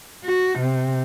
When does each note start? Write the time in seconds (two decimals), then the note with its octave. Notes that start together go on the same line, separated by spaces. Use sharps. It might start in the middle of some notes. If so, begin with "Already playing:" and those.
0.25 F#4
0.59 C3